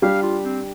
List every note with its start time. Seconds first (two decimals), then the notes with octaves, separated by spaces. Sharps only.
0.02 G3 D4 G4 F5
0.23 F4
0.45 C4